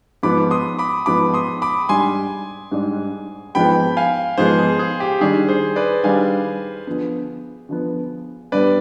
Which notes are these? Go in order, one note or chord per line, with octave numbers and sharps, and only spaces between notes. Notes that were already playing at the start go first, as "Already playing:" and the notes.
G#2 F3 B3 B5 D6
C6 D#6
B5 D6
G#2 F3 B3 B5 D6
C6 D#6
B5 D6
G#2 G3 D4 G#5 C6
G#2 G3 D4
G#2 F3 G#3 B3 G5 B5
F5 G#5
G#2 F3 G#3 B3 G#4 C5
G#4
G#4
G4
D#3 G3 D4 G#4
G#4 C5
B4 D5
D#3 G3 D4 F5 G#5
D3 F3 B3
D3 F3 B3
G2 D3 G3 B3 B4 D5